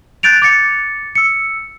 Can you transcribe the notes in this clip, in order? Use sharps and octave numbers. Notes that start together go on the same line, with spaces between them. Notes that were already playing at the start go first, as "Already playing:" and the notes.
F#6 G6 A6 D7 F7
D6 A6 C#7
E6 C#7